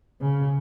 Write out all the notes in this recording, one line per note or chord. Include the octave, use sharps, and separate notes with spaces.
C#3